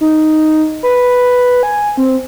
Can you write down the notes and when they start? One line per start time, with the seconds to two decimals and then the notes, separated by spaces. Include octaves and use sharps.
0.01 D#4
0.83 B4
1.63 G#5
1.97 C4